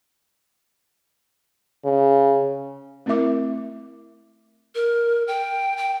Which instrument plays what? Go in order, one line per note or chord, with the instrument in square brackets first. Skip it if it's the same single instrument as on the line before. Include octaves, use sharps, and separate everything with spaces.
[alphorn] C#3
[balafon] A3 C4 E4 A#4 E5 D6
[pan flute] A#4
G5
G5